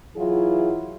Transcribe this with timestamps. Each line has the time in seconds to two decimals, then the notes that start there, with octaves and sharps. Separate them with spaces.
0.16 E3 F#3 E4 F4 G#4